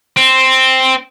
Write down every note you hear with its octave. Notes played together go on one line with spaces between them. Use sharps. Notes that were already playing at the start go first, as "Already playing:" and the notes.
C4